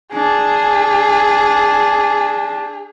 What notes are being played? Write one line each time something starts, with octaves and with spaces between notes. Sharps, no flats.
D4 G#4